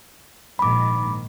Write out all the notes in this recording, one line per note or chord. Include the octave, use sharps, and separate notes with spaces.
A#1 G#2 D#3 B5 D6